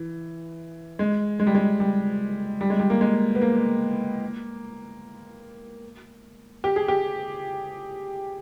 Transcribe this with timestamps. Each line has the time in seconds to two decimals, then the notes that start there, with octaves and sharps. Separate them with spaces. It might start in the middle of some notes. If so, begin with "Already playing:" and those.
Already playing: E3
0.99 G#3
1.40 G#3
1.47 G3
1.55 G#3
1.80 G3
2.61 G3
2.70 G#3
2.80 G3
2.90 A#3
3.01 G#3
3.35 B3
3.41 A#3
6.64 G4
6.76 G#4
6.88 G4